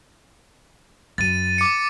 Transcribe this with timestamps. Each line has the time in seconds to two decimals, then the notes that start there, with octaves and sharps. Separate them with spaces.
1.18 F#2 A6 D#7
1.58 D6 C#7